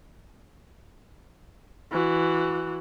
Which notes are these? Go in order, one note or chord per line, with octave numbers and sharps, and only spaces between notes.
E3 F#4